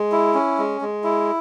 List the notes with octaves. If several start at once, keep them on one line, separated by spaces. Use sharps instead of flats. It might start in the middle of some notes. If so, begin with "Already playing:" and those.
Already playing: G#3
E4
C#4
G#3
G#3
E4